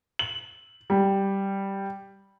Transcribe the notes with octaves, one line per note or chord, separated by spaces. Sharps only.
F#7
G3